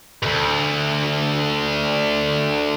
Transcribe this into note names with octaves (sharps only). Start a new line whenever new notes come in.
D2 G2